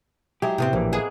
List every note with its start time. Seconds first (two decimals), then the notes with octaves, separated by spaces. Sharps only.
0.42 F#3 G#3 E4 G4 G#4
0.58 A2 C3 B3 C4
0.73 A#1 E3 A#3
0.93 G#3 A#3 B3 G#4